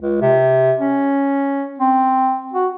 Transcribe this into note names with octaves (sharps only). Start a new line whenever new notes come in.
C#2
C3
C#4
C4
F#4